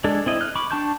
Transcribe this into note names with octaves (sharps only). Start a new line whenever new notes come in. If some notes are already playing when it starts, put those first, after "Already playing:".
G#3 D4 A4
C4 E4 D#5
F6 F#6
B5 C#6 D6
D4 G5 A5 C#6 G6